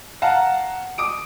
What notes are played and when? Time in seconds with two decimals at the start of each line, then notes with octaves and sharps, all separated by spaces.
0.22 F5 F#5 A5 A#5
0.98 D6 D#6 D7